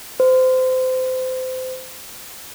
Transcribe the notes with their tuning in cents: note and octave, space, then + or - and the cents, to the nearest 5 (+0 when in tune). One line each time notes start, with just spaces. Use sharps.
C5 -25